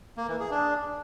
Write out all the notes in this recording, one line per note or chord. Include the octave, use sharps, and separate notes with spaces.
A#3
E3
G#4
D4